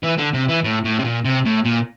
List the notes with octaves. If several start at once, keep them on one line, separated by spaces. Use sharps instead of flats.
E3
D3
C3
E3
A2
A2
C3
A#2
C3
A2
A#2